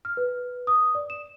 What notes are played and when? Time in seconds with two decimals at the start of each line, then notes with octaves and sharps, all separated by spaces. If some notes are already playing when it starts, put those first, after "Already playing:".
0.05 F6
0.17 B4
0.67 D#6
0.95 D5
1.10 E7